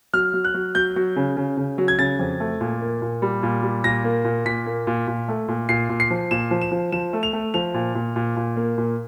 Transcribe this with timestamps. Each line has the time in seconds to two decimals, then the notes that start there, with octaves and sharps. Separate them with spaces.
0.13 F#3 F6
0.34 F#3
0.45 F#6
0.54 F#3
0.75 F#3 G6
0.96 F#3
1.16 C#3
1.37 C#3
1.57 C#3
1.78 F#3
1.88 G#6
1.99 C#3 A6
2.19 F2
2.40 A3
2.61 A#2
2.81 A#3
3.02 A#2
3.22 G3
3.43 A#2
3.63 G3
3.84 A#2 A#6
4.04 A#3
4.25 A#2
4.45 A#2 B6
4.66 A#3
4.87 A#2
5.07 A#2
5.28 A3
5.48 A#2
5.69 A#2 C7
5.89 A#2
6.00 C7
6.11 F3
6.31 A#2 E7
6.51 F3
6.61 E7
6.72 F3
6.92 F3 E7
7.13 A3
7.23 F7
7.33 A3
7.54 F3 F7
7.74 A#2
7.95 A#2
8.16 A#2
8.36 A#2
8.56 A#3
8.78 A#2